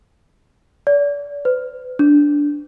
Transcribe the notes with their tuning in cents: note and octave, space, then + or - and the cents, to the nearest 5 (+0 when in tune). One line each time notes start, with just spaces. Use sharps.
D5 -35
B4 +40
D4 -10